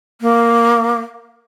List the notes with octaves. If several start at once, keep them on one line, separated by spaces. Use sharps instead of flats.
A#3